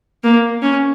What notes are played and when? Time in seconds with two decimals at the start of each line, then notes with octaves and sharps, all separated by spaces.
0.24 A#3
0.62 C#4